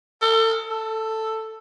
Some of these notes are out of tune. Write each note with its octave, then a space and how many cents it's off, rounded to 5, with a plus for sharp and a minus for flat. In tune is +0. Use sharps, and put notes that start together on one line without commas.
A4 +35
A4 +5